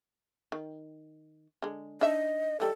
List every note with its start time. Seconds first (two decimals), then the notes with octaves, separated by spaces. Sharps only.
0.52 D#3
1.62 D3 G#3
2.01 D4 D#4 D#5 E5
2.60 E3 G3 D#4 A4